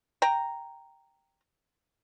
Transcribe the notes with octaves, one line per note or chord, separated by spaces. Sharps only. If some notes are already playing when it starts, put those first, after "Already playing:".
G5 A#5